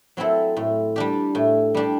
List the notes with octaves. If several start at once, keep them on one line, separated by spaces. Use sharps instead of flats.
F#3 C4 E4 A4
A2
G3 D4 G4
A2
G3 D4 G4